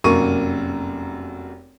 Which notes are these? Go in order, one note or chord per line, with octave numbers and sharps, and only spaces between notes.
F1 F#2 A#3 A#5 C#6 D#7